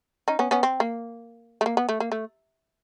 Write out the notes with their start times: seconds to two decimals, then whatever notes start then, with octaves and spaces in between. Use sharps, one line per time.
0.28 C#4 D#4
0.39 B3 C#4
0.51 B3 C#4
0.63 C4
0.80 A#3
1.61 A3
1.66 A#3
1.77 B3
1.89 A3
2.00 A#3
2.12 A3